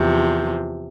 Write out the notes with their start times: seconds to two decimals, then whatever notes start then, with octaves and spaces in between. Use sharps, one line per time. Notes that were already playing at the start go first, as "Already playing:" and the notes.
Already playing: E2 C3 F3